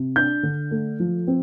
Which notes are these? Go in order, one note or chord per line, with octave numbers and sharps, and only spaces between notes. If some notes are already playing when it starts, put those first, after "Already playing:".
Already playing: C3
D4 G6
D3
A3
F3
C4